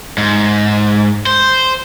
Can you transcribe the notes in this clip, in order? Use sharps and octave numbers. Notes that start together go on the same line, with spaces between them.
G#2
C5